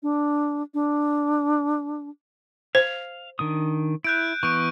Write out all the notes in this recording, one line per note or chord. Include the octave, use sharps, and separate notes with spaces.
D4
D4
C5 F5
D#3 D4 D#6
E4 F#6 G6 D7
E3 B3 C#6 G6 D7